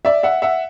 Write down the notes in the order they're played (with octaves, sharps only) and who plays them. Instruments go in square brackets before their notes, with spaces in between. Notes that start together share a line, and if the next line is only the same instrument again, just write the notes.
[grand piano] D5 E5
E5 F#5
E5 F#5